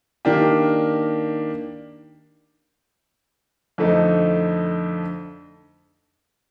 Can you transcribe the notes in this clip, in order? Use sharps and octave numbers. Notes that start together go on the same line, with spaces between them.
D#3 A#3 D4 G4
F2 D3 A3 D#4